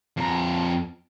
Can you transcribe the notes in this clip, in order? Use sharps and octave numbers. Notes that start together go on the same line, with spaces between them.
F2 A#5